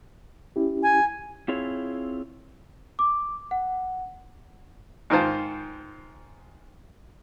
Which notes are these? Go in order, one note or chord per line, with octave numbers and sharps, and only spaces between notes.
C#4 E4 G4
G#5
C4 E4 F4 G#4 C#5
D6
F#5
G#2 D#3 F4 C5 A5